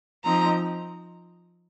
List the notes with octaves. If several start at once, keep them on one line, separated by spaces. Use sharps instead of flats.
F3 C4 D#4 A#5